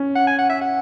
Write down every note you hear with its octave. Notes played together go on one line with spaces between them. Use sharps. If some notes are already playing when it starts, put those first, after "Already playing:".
Already playing: C#4
F#5
G#5
F#5
E5
F#5